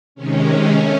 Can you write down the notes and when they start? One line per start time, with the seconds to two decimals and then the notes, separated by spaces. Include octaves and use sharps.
0.15 C3 D#3 G#3 C#4
0.69 A3 C#4